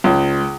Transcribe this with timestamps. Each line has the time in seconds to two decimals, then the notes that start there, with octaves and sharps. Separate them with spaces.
0.04 C#2